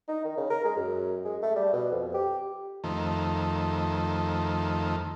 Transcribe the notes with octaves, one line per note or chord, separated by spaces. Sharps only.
D#4
D#3
C#3
A#4
G#3
F#2
G#3
A3
G3
B2
F2
G4
F2 D#3 A3